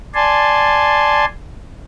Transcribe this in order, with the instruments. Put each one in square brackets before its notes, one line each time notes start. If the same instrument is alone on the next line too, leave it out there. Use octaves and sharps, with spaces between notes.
[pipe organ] D5 G#5 A5 C6